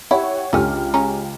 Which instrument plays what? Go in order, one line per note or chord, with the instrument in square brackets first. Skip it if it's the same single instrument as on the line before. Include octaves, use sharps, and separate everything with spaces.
[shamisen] E4 [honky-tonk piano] G4 C#5 F#5
[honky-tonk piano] C#2 G4 F6 [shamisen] D3 C#4
[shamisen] C#3 C#4 A#5